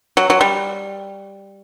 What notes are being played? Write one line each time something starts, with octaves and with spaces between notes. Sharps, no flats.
F#3
F#3
G3